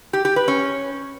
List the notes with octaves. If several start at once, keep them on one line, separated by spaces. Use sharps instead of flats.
G4
G4
B4
C#4